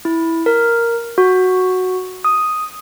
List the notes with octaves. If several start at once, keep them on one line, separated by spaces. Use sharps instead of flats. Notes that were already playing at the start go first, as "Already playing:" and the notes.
E4
A#4
F#4
D#6